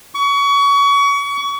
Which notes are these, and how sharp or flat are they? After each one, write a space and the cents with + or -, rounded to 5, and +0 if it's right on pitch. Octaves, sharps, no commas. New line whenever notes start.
C#6 +30